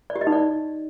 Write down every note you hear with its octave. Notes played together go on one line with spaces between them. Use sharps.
D5
G4
D#5
D#4
D5